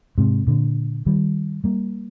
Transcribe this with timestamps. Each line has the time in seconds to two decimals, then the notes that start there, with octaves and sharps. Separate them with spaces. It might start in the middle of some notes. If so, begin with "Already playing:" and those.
0.18 G#2 C3
0.47 A#2 D3
1.06 D#3 G3
1.64 G3 A#3